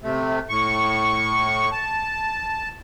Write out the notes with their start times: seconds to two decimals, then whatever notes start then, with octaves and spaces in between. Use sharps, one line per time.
0.03 C3 A3
0.49 A2 C#6
1.72 A5